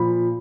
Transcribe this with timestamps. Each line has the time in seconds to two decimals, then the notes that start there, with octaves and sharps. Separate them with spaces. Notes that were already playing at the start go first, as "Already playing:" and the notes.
Already playing: A#2 F3 B5